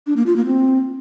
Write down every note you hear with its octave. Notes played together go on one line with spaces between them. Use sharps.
D4
A#3
F4
A#3
C4